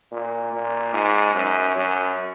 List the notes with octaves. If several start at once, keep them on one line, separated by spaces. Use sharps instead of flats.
A#2
A#2
G#2
F#2
F#2